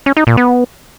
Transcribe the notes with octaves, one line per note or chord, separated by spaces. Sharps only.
C#4
D#4
A#2
B3